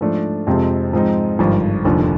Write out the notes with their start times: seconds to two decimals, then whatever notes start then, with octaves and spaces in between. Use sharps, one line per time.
0.01 G#2 F3 A3 D4
0.47 F2 C3 F3 G#3 C4
0.92 G#2 F3 G#3 C4 D#4
1.39 G#1 G2 D3 F3
1.85 F1 D#2 D3 F3